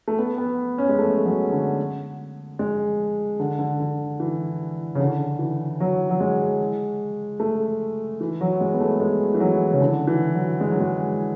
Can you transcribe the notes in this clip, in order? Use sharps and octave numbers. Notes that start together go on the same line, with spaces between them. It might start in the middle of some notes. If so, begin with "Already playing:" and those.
A3
B3
B3
C#4
G#3
A3
F#3
D3
G#3
D3
D3
D3
E3
C#3
D3
E3
F#3
F#3
G#3
A3
E3
F#3
G#3
B3
A3
G#3
E3
F#3
C#3
D3
E3
F#3
G#3
F#3
G#3